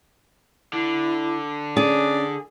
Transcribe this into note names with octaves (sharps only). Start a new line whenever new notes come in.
D3 E4
C#4 G#4 D5